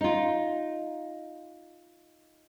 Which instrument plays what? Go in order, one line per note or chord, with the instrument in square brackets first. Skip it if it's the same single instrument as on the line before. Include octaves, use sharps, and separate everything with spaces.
[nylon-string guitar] D#4 F4